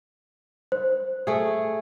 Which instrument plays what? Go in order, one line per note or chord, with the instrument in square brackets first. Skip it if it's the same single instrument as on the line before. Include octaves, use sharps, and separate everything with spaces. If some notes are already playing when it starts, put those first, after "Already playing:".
[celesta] C5
[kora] A3 G#4